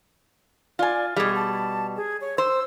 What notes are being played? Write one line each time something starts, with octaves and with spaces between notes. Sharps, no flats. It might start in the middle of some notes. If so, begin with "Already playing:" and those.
F4 D5 G#5
B2 G3 G#4
A5
G#4
C#5
C5 E6